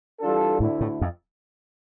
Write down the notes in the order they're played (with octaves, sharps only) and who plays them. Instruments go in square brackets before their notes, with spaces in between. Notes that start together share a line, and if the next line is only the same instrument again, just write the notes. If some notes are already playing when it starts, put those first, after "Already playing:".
[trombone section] E3 G3 D4 F4 A4
[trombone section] D2 D3 A3 E4 [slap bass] A2
[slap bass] A2
F2